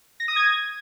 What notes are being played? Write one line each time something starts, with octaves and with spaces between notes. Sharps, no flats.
A#6
D#6
G#6